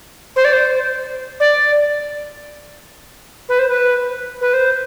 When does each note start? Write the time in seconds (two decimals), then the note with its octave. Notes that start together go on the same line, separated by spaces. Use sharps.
0.36 C5
0.45 D5
0.53 C5
1.40 D5
3.49 B4
3.59 C5
3.68 B4
4.41 B4
4.53 C5